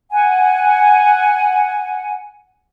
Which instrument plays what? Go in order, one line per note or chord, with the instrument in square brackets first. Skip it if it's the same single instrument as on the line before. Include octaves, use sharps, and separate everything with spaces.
[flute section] F#5 G#5